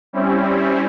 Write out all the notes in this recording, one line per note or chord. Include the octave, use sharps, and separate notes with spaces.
G3 C4 C#4 E4